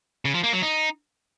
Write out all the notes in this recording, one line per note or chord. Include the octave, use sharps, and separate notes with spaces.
C#3
F3
A#3
F#3
D#4